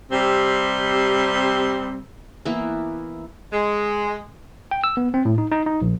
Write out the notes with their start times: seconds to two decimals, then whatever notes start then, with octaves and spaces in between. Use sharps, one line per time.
0.12 C3 G3 C4
2.45 E3 A#3 B3 E4
3.52 G#3
4.71 G5
4.84 E6
4.97 B3
5.14 C4
5.25 A2
5.38 D#4
5.51 D#4
5.66 D#4
5.82 A#1